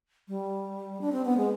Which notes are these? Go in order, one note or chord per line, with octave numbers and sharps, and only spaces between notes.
G3
D4
C4
B3
G#3